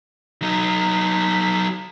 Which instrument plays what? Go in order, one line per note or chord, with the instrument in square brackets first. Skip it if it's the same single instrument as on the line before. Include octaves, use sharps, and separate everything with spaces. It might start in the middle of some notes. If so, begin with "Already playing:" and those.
[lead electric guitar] F#3 D#4